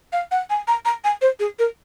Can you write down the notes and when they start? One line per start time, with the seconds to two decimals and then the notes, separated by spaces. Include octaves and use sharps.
0.13 F5
0.31 F#5
0.50 G#5
0.68 A#5
0.85 A#5
1.04 G#5
1.21 C5
1.40 G#4
1.59 A#4